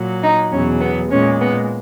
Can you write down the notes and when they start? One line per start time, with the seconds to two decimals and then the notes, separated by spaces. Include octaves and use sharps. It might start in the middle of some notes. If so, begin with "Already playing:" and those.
Already playing: A#2 F#3
0.22 D#4
0.51 E2 B2 F#3 C#4
0.80 B3
1.10 A#2 G#3 C#4
1.40 B3